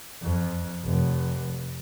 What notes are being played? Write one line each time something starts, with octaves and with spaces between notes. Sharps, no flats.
F2
F1